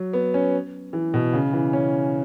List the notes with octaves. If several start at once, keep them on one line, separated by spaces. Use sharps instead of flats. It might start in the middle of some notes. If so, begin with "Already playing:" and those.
Already playing: F#3
B3
C#4
E3
B2
C#3
E3
C#4